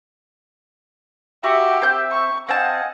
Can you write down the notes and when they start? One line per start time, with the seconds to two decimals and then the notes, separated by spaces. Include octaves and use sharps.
1.44 F#4 G4 E5
1.82 C4 E5 G6
2.11 C#6
2.49 C4 D#5 F5 F#5 G#5 A5